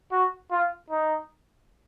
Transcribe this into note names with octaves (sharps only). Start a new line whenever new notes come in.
F#4
F4
D#4